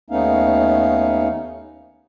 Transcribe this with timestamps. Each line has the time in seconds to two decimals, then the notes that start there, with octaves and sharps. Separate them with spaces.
0.10 D#2 A3 B3 C#4 D#4 F5